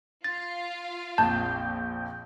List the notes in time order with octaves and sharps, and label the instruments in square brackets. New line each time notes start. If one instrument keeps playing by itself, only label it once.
[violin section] F4 F5 [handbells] A6
[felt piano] A#1 F2 [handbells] A5 [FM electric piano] G6